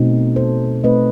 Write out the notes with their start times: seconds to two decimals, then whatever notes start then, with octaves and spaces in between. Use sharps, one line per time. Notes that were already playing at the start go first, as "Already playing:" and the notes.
Already playing: B2 A3 C4 D#4
0.36 A4 C5
0.84 B2 A3 C4 D#4 B4 D#5